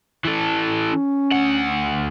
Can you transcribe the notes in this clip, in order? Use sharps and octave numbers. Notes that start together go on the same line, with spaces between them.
E3 A4
C#4
D2 F#5